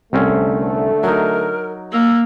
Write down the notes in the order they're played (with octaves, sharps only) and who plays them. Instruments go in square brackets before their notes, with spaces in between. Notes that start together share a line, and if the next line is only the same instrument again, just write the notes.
[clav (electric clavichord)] C2 C4 C#4 [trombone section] D3 A3
[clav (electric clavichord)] F#3 D#4 [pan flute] A#4
[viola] A#3 [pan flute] E6